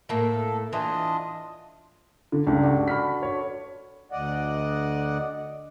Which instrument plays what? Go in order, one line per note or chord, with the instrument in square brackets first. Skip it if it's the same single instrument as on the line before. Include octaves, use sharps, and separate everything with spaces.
[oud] A2 A#3 [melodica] A4
[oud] E3 [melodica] D4 F4 D#5
[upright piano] D3
[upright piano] C#2 G2 [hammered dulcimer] D4 A4
[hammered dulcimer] D4 F#4
[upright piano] B5 F6 B6
C#5
[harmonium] D2 D5 D#5 F#5